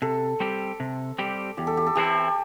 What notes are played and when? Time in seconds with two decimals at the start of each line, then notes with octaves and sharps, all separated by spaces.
0.02 C3 A4
0.40 G3 C4 G4
0.80 C3
1.18 G3 C4 G4
1.57 E2 G4
1.67 A4
1.77 G4
1.86 A4
1.95 E3 C4 E4 G4